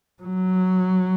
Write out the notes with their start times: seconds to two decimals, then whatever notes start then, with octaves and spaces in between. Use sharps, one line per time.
0.23 F#3